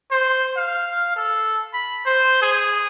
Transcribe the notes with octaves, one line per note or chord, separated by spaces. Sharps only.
C5
F5
A4
B5
C5
G#4